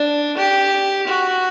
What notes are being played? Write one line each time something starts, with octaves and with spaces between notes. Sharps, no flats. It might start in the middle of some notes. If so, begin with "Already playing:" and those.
Already playing: D4
G4
F#4